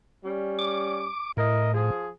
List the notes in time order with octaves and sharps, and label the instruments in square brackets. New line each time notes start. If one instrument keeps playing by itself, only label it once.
[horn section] G3 C#4
[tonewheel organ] D6
[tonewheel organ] A2 [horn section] E4 A#4 D#5
[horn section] F3 G#4